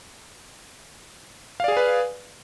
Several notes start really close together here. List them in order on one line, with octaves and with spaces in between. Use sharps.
F5 D5 G#4 G#5 B4